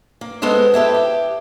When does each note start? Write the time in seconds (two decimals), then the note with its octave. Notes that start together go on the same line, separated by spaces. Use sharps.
0.21 A#3
0.42 G#3 B3 A4 C5 D#5
0.74 E4 G4 A4 B4
0.94 G4